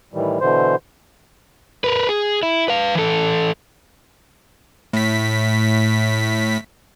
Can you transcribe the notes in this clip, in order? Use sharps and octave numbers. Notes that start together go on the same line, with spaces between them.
A2 D#3 E3 G3
B2 D3 E3 C5
A#4 B4
G#4
E4
B4 F5
E3 A4
A2 B6